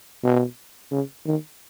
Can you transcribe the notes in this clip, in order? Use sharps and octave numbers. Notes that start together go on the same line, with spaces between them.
B2
C#3
D#3